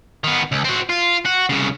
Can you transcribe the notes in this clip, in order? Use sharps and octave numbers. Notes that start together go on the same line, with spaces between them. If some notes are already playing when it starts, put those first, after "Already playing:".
D#3 B3
C#2
C4 F#4
F4
F#4
C2 C#3